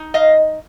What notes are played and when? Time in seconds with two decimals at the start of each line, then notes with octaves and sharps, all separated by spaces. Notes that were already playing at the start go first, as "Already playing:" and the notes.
Already playing: D#4
0.14 D#5 F5